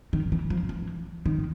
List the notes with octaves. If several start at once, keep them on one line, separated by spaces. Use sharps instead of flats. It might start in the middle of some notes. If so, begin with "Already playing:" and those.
D#3
E3
F3
E3
D#3